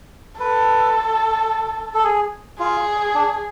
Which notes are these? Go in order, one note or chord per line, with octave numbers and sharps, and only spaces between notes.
A4 B4
A4
G#4
F4 G#4
D4